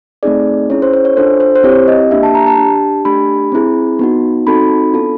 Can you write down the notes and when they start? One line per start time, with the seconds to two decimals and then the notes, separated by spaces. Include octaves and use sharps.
0.23 A3 C4 D#4 G#4 D5
0.70 C#4 E4 G#4 C#5
0.82 C5
0.93 C5
1.05 C#5
1.17 D4 F4 A4 C5
1.40 C5
1.55 C5
1.64 C4 E4 G4 C#5
1.88 D#5
2.11 A#3 D4 G4 E5
2.23 A5
2.35 A#5
2.47 A5
2.58 D4 G4
3.05 A3 D4 G4 B5
3.52 C4 E4 G#4
3.99 B3 D#4 F#4
4.47 C4 D#4 F#4 A4 B5
4.94 B3 D4 F4 A4